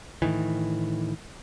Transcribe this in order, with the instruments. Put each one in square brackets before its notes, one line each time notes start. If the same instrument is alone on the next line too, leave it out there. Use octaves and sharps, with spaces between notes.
[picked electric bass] A2 D#3 E3